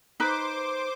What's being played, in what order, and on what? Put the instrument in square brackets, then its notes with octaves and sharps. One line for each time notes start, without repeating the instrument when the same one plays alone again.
[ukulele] D#4 B4 [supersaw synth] C5 D6